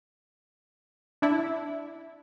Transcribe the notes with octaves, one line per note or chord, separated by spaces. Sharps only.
D4 E4